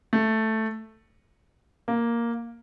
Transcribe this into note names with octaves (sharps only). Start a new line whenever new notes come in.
A3
A#3